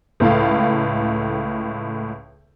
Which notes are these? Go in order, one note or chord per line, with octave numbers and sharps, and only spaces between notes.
C#2 A2 A4 F5